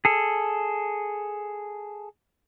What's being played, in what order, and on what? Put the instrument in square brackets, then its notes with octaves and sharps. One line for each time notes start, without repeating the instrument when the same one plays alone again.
[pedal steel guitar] G#4 A4